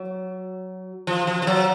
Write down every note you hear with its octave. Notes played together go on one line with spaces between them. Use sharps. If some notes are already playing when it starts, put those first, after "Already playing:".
Already playing: F#3
F3
F3
F3
F#3